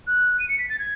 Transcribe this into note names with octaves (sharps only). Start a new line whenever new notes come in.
F#6
D#7
C#7
B6
A6
G#6